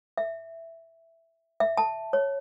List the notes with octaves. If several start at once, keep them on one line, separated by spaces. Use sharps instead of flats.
E5
E5
A5
C#5